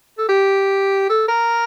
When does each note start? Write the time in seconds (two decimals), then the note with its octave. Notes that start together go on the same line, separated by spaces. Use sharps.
0.18 A4
0.29 G4
1.09 A4
1.28 A#4